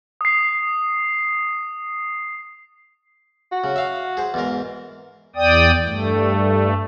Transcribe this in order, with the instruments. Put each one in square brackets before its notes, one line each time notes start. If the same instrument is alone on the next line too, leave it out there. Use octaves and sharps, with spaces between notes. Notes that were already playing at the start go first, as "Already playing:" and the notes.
[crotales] D#6 C7
[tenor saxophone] F#4
[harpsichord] C#3
E5 F5
G#4 C5
E2 G#2 A#4
[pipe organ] E2 D5 G5 D#6
G2 A3